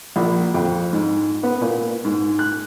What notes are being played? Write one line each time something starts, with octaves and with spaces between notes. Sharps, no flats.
A#1
F2
G#2
B3
A#2
G#2
F#6